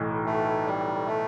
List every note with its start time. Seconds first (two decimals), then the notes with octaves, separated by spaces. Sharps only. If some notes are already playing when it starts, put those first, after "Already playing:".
Already playing: B1 A2 E3
0.27 A3
0.67 G3
1.07 A3